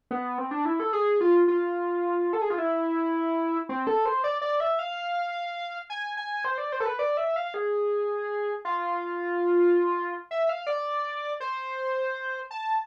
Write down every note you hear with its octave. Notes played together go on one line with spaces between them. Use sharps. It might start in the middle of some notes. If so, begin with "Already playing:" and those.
B3
C4
D4
E4
A4
G#4
F4
F4
A4
G#4
F4
E4
C4
A4
C5
D5
D5
E5
F5
G#5
G#5
C5
D5
C5
A4
B4
D5
E5
F5
G#4
F4
E5
F5
D5
C5
A5